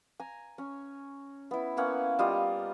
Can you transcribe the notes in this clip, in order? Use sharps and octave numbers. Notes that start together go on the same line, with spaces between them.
G#5 A#5
C#4
B3 E4
A#3 B3 C#4 F#5
G3 F4 D#5